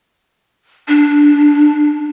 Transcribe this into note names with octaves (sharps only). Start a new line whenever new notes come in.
D4